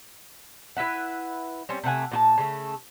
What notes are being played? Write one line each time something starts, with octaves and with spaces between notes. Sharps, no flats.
E4 B4 E5 F#5
G3 C4 C#4
C3 A3 F#5 G#5
A#2 F#4 A5
C#3 A3